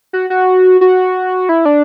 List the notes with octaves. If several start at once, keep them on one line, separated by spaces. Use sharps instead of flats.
F#4
F#4
F#4
E4
D4